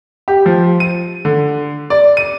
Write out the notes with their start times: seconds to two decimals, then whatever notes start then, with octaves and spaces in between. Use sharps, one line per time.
0.28 G4
0.46 F3
0.80 D#7
1.25 D3
1.90 D5
2.17 D#7